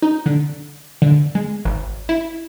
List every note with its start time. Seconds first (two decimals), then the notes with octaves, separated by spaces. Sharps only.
0.02 D#4
0.26 D3
1.02 D3
1.35 G#3
1.65 G#1
2.09 E4